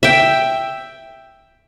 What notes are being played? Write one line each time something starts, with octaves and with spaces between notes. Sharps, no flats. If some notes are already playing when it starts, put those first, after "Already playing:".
E5 G5